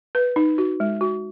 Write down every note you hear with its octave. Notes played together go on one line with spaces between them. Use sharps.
B4
D#4
F#4
G#3
F#4